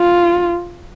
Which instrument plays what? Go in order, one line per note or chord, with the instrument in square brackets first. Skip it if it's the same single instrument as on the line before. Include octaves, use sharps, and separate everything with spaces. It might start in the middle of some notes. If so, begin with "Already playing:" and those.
Already playing: [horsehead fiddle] F4